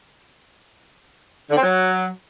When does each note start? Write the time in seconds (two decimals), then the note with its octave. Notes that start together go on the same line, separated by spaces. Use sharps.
1.50 D3
1.57 C4
1.63 F#3